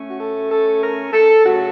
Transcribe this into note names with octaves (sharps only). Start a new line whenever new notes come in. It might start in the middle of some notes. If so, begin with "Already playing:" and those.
Already playing: A2 A3 C#4
F#4
A4
A4
A#4
A4
C#3 F#3 A3 F#4